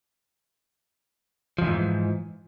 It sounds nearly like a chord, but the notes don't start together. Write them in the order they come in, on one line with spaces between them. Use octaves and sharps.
F3 F2 E3 G#2